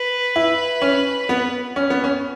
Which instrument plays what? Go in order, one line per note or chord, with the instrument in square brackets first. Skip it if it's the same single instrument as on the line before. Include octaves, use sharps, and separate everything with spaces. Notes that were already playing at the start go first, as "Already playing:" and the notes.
Already playing: [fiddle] B4
[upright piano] E4
C#4
B3
C#4
B3
C#4